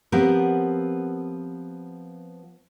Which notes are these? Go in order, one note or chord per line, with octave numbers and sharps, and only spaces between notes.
F3 B3 C4 G4 A#4